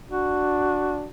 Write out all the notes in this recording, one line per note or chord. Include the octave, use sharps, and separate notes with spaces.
D4 F#4